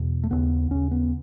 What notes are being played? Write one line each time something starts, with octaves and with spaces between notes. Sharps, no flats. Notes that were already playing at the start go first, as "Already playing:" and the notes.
Already playing: E2 B2
A3
D#2 C#3 B3
D#2 C#3 C#4
B3